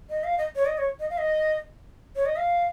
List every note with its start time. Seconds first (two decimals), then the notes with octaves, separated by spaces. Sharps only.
0.10 D#5
0.24 F5
0.38 D#5
0.56 C#5
0.66 D#5
0.78 C#5
1.00 D#5
1.10 F5
1.18 D#5
2.16 C#5
2.26 D#5
2.37 F5